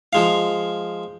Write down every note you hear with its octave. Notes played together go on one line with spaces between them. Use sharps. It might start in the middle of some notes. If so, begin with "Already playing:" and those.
F3 G#3 F5